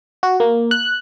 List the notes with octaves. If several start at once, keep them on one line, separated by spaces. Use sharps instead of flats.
F#4
A#3
F#6